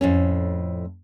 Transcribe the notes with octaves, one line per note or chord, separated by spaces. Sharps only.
F2 A2 C#4